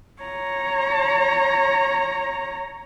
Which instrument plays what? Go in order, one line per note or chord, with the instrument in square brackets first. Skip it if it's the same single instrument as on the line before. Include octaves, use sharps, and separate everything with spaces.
[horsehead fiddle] C#5 A#5